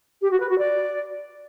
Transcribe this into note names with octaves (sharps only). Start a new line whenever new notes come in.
G4
F#4
B4
F#4
D5